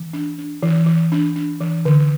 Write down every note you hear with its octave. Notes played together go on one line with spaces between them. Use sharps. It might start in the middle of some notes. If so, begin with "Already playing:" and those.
Already playing: E3
D4
D4
E3
E3
D4
D4
E3
D3